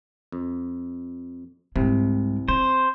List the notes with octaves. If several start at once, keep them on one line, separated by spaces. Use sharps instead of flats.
F2
C2 G#2 C3 G#3
C4 C5